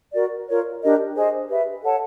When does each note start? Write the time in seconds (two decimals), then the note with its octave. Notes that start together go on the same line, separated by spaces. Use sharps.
0.13 F#4 A#4 D5
0.47 F4 A#4 C#5
0.81 D4 G4 A#4 D#5
1.15 G#4 C5 D#5 G#5
1.49 G4 B4 E5
1.84 A4 C#5 F#5 A5